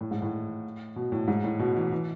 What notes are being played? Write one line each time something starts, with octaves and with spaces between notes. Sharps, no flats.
A2
G#2
A2
B2
A2
G#2
A2
B2
E3
E3